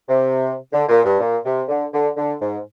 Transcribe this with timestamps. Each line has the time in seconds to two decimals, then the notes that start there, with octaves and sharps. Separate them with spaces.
0.08 C3
0.72 D3
0.89 A#2
1.05 G2
1.20 A#2
1.45 C3
1.68 D3
1.92 D3
2.16 D3
2.41 G#2